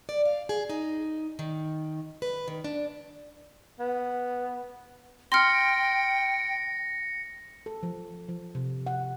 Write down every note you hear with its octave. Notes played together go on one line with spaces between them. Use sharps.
D5
F5
G#4
D#4
D#3
B4
D#3
D4
B3
G5 C6 F6 A#6 C#7
A4
F3
F3
C3
F#5